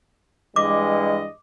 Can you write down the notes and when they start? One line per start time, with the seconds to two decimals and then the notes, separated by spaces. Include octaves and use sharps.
0.56 G2 E3 G#3 D#5 D6